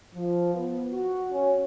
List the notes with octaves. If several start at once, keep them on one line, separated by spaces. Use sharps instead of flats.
F3
B3
F#4
C#4